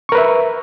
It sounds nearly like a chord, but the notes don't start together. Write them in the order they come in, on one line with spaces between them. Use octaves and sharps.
C#6 A#4 B4 E5